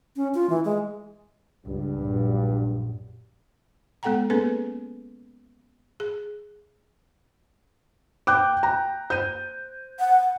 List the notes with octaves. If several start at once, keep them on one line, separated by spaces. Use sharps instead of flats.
C#4
F4
E3
G#3
C#2 G2
A#1 F#2
G#3 B3 A4 F#5 G5 A#5
A#3 B3 C#4 G#4 A4 B4
G#4
G5 D6 F#6 G6
A#5
C5 G6 D#7
F#5